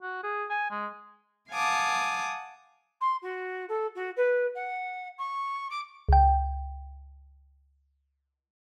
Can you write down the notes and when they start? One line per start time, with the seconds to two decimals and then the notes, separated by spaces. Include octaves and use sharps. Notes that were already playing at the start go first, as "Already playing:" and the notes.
0.02 F#4
0.23 G#4
0.50 G#5
0.71 G#3
1.51 F5 F#5 G#5 A5 D6 D#6
3.00 C6
3.22 F#4
3.68 A4
3.95 F#4
4.16 B4
4.55 F#5
5.18 C#6
5.70 D6
6.09 C#2 G5